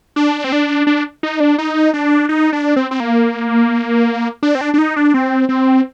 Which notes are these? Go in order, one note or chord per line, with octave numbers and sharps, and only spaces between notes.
D4
C4
D4
D4
D#4
D4
D#4
D4
D#4
D4
C4
C4
A#3
D4
C4
D4
D4
D#4
D4
C4
C4